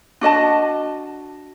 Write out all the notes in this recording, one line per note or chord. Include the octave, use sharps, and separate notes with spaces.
D4 F#4 D#5 A5